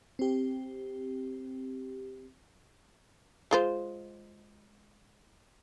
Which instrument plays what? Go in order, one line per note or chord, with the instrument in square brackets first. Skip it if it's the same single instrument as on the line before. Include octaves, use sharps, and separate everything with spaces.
[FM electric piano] C4 G4
[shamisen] G#3 F4 C5